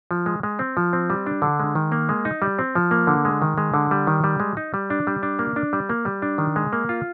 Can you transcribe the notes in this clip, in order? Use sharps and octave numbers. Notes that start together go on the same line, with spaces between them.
F3
G#3
G#3
C4
F3
C4
G3
D4
D3
G#3
D#3
A#3
G#3
D#4
G3
C4
F3
A#3
D3
G#3
D#3
G#3
D3
G3
D#3
G3
G#3
D#4
G3
D4
G3
D4
A#3
D4
G3
A#3
G3
D4
D#3
G#3
A#3
F4